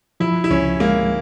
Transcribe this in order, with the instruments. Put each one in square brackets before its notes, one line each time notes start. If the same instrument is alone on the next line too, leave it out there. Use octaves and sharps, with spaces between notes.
[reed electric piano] F3 [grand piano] E4
[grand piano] E4
[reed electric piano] C#2 [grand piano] C#4
[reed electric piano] G#3 [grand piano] A#3